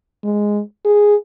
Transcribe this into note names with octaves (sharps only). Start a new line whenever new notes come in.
G#3
G#4